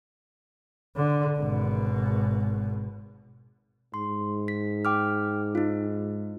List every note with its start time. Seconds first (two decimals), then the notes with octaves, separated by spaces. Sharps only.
0.96 D3
1.37 G#1 B2
3.94 G#2 C6
4.48 B6
4.85 G5 D6 F6
5.55 D#4 F4